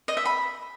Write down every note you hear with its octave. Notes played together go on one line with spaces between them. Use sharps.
D#5
E5
B5